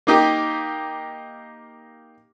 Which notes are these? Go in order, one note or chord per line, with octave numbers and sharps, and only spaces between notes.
A#3 D#4 G4